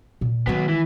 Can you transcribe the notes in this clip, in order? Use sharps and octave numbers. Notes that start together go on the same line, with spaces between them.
A#2
D#3 F#3 G#3 B3
E3